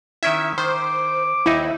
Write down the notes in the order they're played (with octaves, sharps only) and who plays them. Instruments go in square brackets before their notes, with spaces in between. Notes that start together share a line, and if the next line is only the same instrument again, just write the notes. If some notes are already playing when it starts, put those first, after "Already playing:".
[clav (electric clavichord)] D#3 C#4 E4 [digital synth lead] E5
[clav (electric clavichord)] D#3 [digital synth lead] C5 [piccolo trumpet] D6
[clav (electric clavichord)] D#2 D#4 [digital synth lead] E4